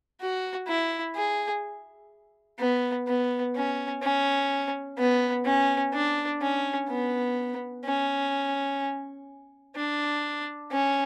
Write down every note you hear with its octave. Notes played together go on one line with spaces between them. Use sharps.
F#4
E4
G#4
B3
B3
C#4
C#4
B3
C#4
D4
C#4
B3
C#4
D4
C#4